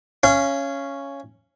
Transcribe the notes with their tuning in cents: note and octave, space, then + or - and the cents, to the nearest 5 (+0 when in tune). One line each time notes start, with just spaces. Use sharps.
C#4 +0 F5 -30